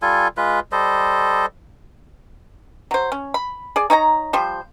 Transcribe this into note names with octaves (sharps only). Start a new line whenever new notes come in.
G3 F4 A4 G#5
G#3 F4 B4
G3 A4 C5 D#5
F#3 C5
C#4
B5
G#4 D5
D#4 C#5 G5 A#5
F3 G3 C5